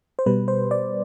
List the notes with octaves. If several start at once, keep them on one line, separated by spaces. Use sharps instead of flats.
C5
B2 G3 B4
C5
D5